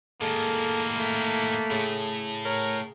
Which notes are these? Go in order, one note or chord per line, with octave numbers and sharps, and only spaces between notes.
A2 D#3 G#3 A#3 A4
A3
A2 C#3 A5
A#4 C#5